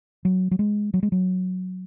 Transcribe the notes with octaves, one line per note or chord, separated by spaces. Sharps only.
F#3
F#3
G#3
F#3
G#3
F#3